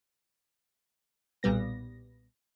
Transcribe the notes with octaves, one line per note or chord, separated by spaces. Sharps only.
B1 A#2 G3 B3 A#6